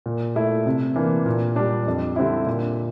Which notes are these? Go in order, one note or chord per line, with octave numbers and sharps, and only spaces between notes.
A#2
A3 E4
C3
E3 A#3 D4
A#2
G3 D4
F2
D3 G3 C4 E4
A#2